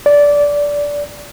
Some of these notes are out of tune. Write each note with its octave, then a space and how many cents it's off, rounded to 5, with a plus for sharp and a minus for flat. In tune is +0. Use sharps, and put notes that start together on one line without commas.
D5 -15